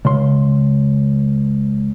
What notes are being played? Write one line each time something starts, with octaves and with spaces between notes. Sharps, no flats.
C#2 C6